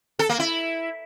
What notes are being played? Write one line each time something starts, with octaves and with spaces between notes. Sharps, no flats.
A4
A#3
E4